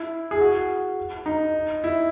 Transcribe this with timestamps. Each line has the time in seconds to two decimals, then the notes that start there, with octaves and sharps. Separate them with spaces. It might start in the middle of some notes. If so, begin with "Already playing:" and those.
Already playing: E4
0.31 G#4
0.40 F#4
1.26 D#4
1.84 E4